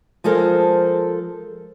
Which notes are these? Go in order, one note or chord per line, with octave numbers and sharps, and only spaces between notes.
F3 G#3 A4 A#4 C5